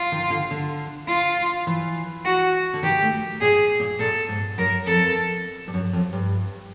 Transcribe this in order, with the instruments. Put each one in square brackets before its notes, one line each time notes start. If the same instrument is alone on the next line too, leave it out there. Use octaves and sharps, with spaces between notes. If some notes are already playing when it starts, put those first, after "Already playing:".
Already playing: [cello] F4
[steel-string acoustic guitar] D#3
D3
D3
[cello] F4
[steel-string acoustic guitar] E3
[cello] F#4
[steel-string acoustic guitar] D3
[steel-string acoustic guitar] D#3 [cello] G4
[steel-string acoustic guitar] A3
[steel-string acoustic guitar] A#2 [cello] G#4
[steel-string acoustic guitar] A#2
[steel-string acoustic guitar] A#2 [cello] A4
[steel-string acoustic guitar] G#2
[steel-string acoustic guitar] F#2 [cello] A#4
[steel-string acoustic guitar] F2 [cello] A4
[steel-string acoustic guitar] G2
F#2
F2
G2